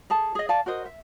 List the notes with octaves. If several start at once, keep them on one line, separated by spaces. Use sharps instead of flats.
G#4 A4 A5
G#4 D#5
D5 F5 A5
F#4 A#4 C5 D#5
E5